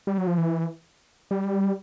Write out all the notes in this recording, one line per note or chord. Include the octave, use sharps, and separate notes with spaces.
G3
F#3
F3
E3
G3